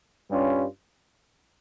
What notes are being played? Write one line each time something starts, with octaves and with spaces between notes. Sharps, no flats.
G2 G3 C#4 F4